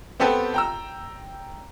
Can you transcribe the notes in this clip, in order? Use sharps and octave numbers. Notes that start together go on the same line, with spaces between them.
B3 C4 G4 A4 B4
G5 A#5 E6